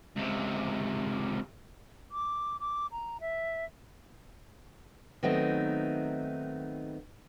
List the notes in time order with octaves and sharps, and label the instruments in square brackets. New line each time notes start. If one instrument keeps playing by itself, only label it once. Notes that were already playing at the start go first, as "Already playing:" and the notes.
[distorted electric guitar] C#2 C3
[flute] D6
D6
A#5
E5
[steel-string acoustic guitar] D#3 F#3 A3 B3 C4 D#4